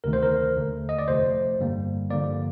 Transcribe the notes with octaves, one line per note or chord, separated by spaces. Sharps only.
D2 C3 D#3 A3 A#4
C5
A#4
D#2 D3 A3
D#5
D5
G1 F2 C3 F3 A3 C5
G2 D3 G3 A#3
G2 D3 F3 A#3 D5